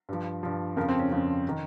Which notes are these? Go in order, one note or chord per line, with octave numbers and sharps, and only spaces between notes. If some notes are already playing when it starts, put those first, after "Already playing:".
G2 F3
G2 F3
F2 C#3 F3 A#4
C4
C#4
F2 C#3 F3
D#3